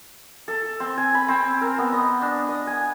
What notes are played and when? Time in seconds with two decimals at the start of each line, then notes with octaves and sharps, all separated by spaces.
0.48 A4
0.80 C4
0.98 G#5
1.15 B5
1.28 C4
1.61 A#4
1.78 B3
1.92 D#5
2.22 D4
2.49 D#5
2.67 G#5